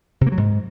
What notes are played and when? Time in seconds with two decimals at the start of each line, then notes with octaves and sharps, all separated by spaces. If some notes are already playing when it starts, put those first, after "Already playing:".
0.21 C3
0.27 A#3
0.32 F#3
0.37 G#2